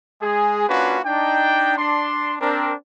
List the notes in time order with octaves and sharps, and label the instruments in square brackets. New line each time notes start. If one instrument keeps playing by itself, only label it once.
[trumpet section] G#3 G#4
A#3 C#4 D4 F4 F#4 B4
D4 D#4 G5
D4 C6
C4 D4 A#4